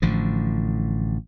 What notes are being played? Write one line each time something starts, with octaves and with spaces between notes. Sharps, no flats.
A1 A2 D3 F3